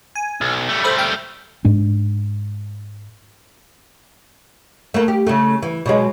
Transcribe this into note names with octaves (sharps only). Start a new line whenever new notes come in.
G#5
B1
G3 A3
A4 C5 B5
G5 F6 G6
G#2 G#3 D4
A3 A#3
G4
C#3 A3
E3
B2 F#3 G#3